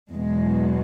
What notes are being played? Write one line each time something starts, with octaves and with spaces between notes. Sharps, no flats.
E2 B2 F#3 G#3